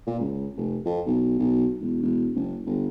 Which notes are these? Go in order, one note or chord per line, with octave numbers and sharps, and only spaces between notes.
A#2
C#2
F1
F2
B1
B1
E1
E1
F#1
G1